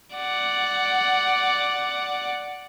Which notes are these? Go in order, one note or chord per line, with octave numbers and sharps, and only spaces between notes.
D5 F#5